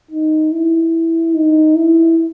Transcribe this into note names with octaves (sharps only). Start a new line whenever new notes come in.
D#4
E4
D#4
E4